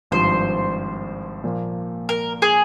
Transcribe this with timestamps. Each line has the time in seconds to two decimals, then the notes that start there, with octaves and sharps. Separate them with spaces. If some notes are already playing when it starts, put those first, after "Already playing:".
0.11 G#1 G2 F3 C5
1.44 A#2 F3 A#3
2.09 A#4
2.42 G#4